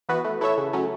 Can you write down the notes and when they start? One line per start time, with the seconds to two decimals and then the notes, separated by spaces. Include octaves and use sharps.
0.09 E3 B3 F#4 B4
0.24 A3
0.41 E4 A4 C#5 E5
0.57 C#3
0.73 F#3 A3 C#4